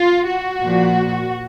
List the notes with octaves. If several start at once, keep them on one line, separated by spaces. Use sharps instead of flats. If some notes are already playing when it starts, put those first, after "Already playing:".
Already playing: F4
F#4
A#2 F3